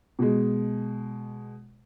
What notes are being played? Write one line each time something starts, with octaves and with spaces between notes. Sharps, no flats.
B2 G#3